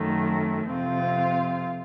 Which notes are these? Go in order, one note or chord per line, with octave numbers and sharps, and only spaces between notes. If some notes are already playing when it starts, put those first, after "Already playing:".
Already playing: F#2 D#3 A3
F2 C3 F3 C4 F4